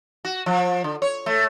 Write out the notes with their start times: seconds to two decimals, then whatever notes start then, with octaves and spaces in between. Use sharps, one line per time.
0.25 F#4
0.46 F3
0.84 D3
1.02 C#5
1.26 A3